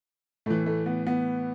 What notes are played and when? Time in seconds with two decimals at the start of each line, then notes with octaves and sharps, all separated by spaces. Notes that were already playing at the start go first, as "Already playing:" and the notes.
0.46 A2 E3 A3
0.66 A3
0.86 B3
1.06 B3